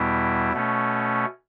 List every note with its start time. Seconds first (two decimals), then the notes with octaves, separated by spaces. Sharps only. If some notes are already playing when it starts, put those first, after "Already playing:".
Already playing: E2 B2 G3 B3 E4
0.53 B2 A3 C#4